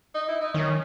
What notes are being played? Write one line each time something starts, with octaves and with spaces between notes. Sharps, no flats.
D#4
E4
D#4
D#3 C#4